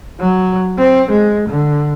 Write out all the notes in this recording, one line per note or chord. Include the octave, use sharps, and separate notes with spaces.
F#3
C4
G#3
D3